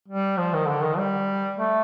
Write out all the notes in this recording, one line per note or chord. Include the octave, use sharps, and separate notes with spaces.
G3
F3
D#3
D3
D#3
G3
A3